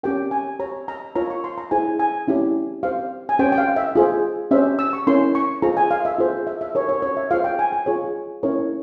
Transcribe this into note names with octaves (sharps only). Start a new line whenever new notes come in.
C#4 G4 A#4 G5
G#5
G4 C#5 A#5
A#5
F4 A#4 C#5 A#5
C#6
C6
A#5
E4 G#4 C5 G#5
G#5
C#4 E4 G4
G4 C5 F5
G#5
C#4 G4 C5 G5
G5
F5
E5
F4 G#4 C5
C#4 G4 C5 E5
E6
C#6
C#4 E4 A#4 C6
C#6
F4 G#4 C5 A#5
G#5
F5
E5
F4 G#4 C5
E5
E5
G4 A#4 C#5
C#5
C#5
E5
F4 G#4 C5 F5
G5
G#5
G#5
F4 G#4 C#5
C#4 E4 A#4 C#5